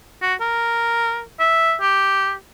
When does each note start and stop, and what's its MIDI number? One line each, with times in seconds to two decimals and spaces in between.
0.22 0.34 66
0.40 1.23 70
1.40 1.75 76
1.81 2.34 67